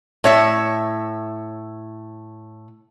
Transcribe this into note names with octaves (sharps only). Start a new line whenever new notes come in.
A2 C#5 E5